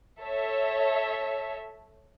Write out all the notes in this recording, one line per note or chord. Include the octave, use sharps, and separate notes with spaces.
A4 C#5 E5